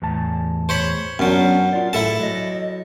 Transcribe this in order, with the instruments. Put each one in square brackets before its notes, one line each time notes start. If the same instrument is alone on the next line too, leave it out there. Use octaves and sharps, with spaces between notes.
[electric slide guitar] E2 A2 A5
[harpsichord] C5 C#5 B5
[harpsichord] F#2 F#3 [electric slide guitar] B3 C#4 D4
[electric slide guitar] F4 D5
[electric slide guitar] A2 [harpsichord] E4 A4 A5
[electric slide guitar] F#3 D#5